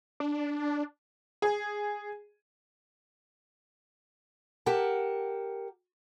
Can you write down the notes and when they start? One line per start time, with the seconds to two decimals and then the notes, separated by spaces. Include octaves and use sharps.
0.20 D4
1.42 G#4
4.66 G4 A#4 F#5 A5